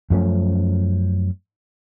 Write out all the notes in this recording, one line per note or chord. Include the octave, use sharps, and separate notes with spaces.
F#2 F3 A3 C#4